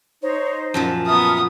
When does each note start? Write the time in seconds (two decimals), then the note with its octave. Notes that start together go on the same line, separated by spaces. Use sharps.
0.22 D#4 C5 C#5
0.74 F#2 A#2 F3 A5
1.07 B3 E5 A#5 D#6 F6